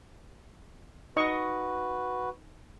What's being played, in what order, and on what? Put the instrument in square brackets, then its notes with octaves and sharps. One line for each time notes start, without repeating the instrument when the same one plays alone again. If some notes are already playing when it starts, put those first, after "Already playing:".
[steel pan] D#4 D#5 C#6 [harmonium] F#4 B4